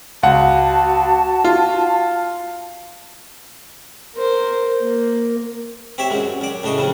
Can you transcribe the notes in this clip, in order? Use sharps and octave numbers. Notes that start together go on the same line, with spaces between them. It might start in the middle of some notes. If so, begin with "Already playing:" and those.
C#2 F#4 F#5 A5
F4
A#4 C5
A#3
C4 G4 C#5 E5
F#2 F#3 G#3
F#2 D5
A2 C#3 D4 D#5 C#6
F2 C#3 G3